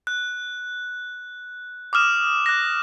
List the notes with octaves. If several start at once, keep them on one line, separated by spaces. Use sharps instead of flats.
F#6
D6 D#6 F6 E7
F#6 A#6